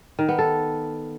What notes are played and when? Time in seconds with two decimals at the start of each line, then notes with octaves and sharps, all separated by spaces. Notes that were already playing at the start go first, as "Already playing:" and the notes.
0.19 D#3
0.29 B3
0.38 A4